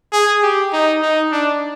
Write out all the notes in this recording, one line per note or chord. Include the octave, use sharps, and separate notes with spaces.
G#4
G4
D#4
D#4
D4